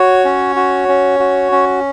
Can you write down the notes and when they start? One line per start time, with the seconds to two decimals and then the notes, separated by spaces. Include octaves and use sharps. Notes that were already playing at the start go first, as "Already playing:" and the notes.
Already playing: F#4 C#5
0.25 C#4
0.56 F#4
0.88 C#4
1.20 F#4
1.52 C#4